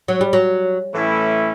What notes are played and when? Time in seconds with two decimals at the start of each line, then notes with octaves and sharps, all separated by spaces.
0.08 F#3
0.21 G3
0.33 F#3
0.93 A2 E3 A3 C#4 E4